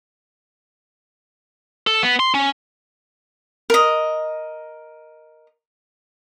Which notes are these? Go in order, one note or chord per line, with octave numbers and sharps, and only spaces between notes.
A4
B3
C6
C#4
A#4 D#5